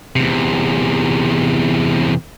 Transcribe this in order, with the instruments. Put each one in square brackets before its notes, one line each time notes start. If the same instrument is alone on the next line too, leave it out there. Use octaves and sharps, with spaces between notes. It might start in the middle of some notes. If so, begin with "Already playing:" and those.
[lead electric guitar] E2 C3